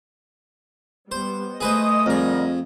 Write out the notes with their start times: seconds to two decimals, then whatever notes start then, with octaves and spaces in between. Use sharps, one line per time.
1.12 G3 B3 C5
1.60 A3 G#4 B4 C5 D#5 D#6
2.06 F2 D3 G3 G#4 A#4